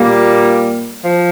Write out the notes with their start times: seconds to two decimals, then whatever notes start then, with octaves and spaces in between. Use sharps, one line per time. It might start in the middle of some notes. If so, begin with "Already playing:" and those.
Already playing: A#2 G3 A#3
1.02 F3